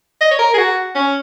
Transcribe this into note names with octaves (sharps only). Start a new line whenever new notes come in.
D#5
C#5
A#4
G#4
F#4
C#4